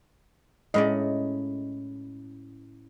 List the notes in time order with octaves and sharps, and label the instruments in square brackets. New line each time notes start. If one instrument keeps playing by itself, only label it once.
[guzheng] A2 C#4 D5 [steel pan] G#3 D#5